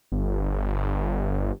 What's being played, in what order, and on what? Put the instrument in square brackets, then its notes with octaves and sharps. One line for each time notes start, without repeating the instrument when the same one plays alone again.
[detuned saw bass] G1